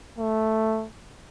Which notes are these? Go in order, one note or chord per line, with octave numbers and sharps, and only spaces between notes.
A3